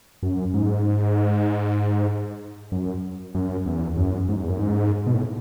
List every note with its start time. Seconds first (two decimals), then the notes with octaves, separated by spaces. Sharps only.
0.23 F#2
0.54 G#2
2.72 F#2
3.35 F#2
3.66 E2
3.97 F#2
4.29 G#2
4.36 F#2
4.43 E2
4.50 F#2
4.59 G#2
5.07 B2
5.14 A2